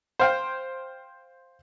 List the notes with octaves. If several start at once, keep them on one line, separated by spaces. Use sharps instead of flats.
C5 F5 G5